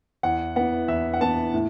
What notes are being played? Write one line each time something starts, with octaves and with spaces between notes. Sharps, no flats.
E2 F#5
E3 B3 F#5
E2 E5
F#5
E3 B3 A5
A2